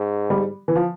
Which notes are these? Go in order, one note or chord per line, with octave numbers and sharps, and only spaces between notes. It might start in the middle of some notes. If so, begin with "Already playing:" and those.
Already playing: G#2
G3
E3
F3